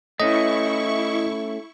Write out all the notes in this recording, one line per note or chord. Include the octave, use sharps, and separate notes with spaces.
A3 C#4 E4 D#5 C#6